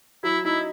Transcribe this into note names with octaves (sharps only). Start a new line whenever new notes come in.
F#3 E4
D#4 E4